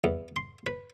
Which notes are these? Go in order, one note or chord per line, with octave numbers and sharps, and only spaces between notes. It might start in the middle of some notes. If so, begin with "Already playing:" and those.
E2
C6
B4